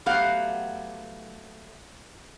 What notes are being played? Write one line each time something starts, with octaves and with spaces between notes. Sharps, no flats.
F#3 A3 B3 G4 F5 F#5